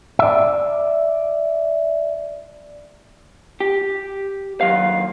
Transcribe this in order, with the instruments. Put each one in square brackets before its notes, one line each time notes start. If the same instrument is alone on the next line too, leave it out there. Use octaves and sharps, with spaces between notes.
[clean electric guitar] D5 E5
G4
D#2 F#3 F5